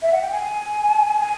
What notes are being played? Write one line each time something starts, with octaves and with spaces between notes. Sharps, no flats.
E5
F#5
G5
G#5
G#5